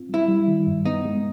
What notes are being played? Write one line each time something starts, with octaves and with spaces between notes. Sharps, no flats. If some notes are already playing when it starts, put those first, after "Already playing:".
Already playing: C4 F4
G3 E4
G3
D#3
G2
B3 D#4
G#3